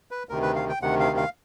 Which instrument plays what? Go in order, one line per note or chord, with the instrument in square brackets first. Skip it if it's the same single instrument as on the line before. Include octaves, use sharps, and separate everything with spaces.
[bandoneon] B4
D2 C3 D#3 A#4
B4
F5
G5
D2 C3 D#3 F#5
F5
F5